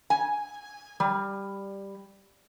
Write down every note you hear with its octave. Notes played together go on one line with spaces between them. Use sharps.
G#5
G3